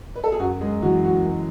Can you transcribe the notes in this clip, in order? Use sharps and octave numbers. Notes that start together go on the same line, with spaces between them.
B4
A4
G#4
F#2 F#3 F#4
G#3 G#4
E3 F#3 F#4
F#3 F#4
F#2